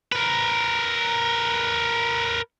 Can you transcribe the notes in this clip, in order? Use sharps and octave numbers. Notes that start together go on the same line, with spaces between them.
A#4 B4